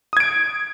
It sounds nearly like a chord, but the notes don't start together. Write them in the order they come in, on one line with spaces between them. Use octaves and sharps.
D#6 G#6 D7